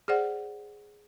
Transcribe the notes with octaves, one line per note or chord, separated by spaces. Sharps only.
G#4 C5 D5 F#5